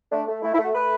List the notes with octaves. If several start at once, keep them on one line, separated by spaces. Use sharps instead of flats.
A3 D4
A3
A3 E4
E4
A3
F#4
A3 B4